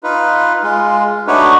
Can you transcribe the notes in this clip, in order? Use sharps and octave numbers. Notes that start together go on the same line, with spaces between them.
D#4 F4 B4
G#3 F4
A3 D4 D#4 F#4 B4 C#5